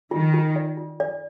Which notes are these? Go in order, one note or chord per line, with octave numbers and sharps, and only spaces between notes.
D#3 F4
F4
D5
F4
D5